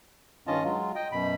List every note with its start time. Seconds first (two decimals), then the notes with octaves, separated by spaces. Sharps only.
0.47 G2 D#3 C#4 F4 D#5 A5
0.64 F#3 G#3 F4
0.95 D#5 G5
1.12 F#2 B2 B5